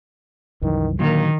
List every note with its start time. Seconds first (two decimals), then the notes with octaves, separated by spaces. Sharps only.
0.62 C2 F#2 D#3 E3
0.99 A#2 D3 D#3 F#3 A#3